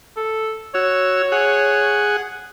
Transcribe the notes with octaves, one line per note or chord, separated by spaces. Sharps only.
A4
F#4 C#5 E6
G#4 F#5